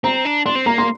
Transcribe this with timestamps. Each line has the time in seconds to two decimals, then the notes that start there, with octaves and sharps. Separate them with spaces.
0.04 C4 A#5
0.25 D4
0.46 D4 C6
0.55 C4
0.66 A#3 A#5
0.78 C6